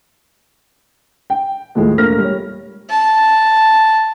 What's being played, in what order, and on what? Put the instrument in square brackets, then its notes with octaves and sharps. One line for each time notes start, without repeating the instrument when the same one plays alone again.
[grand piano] G5
D#2 A2 F3 G#3 A3
E1 A3 A#3 F6 A#6
G3 C#5
[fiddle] A5